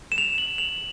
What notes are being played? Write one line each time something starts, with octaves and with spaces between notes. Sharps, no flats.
E7
F7
F#7
F7